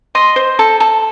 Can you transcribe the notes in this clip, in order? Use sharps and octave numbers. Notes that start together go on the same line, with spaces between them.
D#5 C6
C5
A4
A4